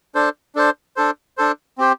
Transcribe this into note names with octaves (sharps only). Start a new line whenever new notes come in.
D4 A4 C5
D4 A4 C5
D4 A4 C5
D4 A4 C5
C4 G4 C5